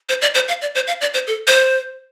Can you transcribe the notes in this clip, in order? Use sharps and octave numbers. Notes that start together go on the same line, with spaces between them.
C5
D5
C5
F5
D5
C5
F5
D5
C5
A4
C5